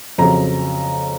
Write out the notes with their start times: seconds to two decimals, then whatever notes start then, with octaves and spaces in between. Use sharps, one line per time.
0.18 F2 C#3 F#3 A#5